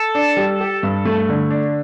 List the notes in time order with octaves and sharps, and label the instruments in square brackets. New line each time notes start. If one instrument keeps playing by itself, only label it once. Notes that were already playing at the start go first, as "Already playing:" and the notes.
Already playing: [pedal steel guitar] A4
[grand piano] D4
G3
G4
G2
A3
D3
D4